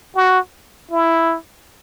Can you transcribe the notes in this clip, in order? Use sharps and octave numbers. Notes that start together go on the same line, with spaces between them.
F#4
E4